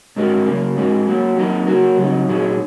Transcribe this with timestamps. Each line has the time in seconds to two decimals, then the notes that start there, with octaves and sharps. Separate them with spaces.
0.16 G#2 G#3 F#4 A#4
0.46 F#2 C#3 A#3
0.76 G#2 G#3 F#4 A#4
1.07 F#3 A#3 F#4
1.37 F#3 A#3 D#4 A#4
1.67 F#3 A#3 F#4 A#4
1.97 C#3 F#3 D#4
2.28 A#2 F#3 D#4 G#4